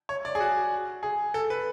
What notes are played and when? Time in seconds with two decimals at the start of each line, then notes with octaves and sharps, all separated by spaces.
0.09 C#5
0.25 D5
0.35 G#4
0.40 F#4
1.03 G#4
1.34 A4
1.50 B4